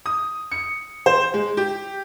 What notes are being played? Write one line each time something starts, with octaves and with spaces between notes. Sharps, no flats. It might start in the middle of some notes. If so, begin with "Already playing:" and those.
D#6
C#7
C5
G#3
G4